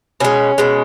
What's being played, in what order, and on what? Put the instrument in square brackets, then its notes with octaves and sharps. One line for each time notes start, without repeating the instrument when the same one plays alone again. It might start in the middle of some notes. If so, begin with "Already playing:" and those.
[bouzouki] B2 G#3 C#4
B2 G#3